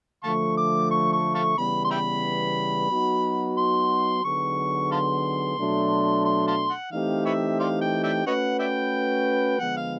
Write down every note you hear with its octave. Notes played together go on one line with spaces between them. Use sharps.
D3 F3 A3 F5 A5 C#6
D6
C#6
C#6
F5 A5 C#6
C#3 E3 G3 B3 B5
C6
E5 G5 B5
F#3 B3 D#4 F#4
C6
D3 F#3 B3 D#4 G#4 C#6
F5 A5 C6
B2 F#3 A3 D4
C6
F5 A5 C6
F#5
E3 A3 C4 D#4 G4 F5
B4 C#5 E5
C5 D5 F5
G5
D5 E5 G5
A3 C#4 F#4 B4 C#5 D#5 F#5
D5 E5 G5
D3 F3 G#3 B3 F#5
F5